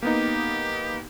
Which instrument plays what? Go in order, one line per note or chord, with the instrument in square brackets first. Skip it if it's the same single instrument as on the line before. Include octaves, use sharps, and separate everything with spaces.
[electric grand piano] A#3 B3 D#4 [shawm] G4